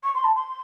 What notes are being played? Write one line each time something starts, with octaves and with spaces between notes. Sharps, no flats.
C#6
C6
A5
C6